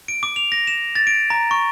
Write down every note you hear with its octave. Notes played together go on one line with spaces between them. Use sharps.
D7
D6
F7
A#6
E7
A6
D7
A#5
C#6